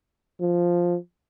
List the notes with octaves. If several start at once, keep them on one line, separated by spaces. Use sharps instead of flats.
F3